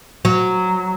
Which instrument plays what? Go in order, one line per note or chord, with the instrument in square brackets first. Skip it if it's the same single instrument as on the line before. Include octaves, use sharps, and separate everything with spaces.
[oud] F#3